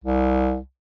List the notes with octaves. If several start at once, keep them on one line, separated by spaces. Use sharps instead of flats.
C2